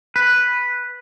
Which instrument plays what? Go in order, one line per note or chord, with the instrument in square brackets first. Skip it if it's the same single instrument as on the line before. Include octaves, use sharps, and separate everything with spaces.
[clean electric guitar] B4